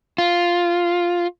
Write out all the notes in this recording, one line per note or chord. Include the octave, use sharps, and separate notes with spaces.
F4